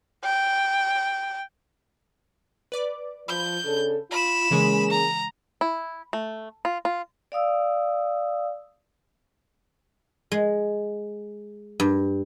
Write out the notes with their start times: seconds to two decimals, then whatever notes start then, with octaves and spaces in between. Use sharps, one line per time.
0.24 G5
2.72 B4 D5 D6
3.28 F3 B5 G6
3.64 C#3 D4 A4
4.11 F4 B5 E7
4.51 C#3 E3 G#3 A#3 C#4 G#4
4.91 A#5
5.61 E4
6.13 A3
6.65 F4
6.85 F4
7.32 D5 F5 D#6 E6
10.32 G#3
11.80 G2